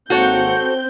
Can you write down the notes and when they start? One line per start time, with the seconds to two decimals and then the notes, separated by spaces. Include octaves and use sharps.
0.10 G#1 A#3 C4 F#4 A4 C#5 F#5 G6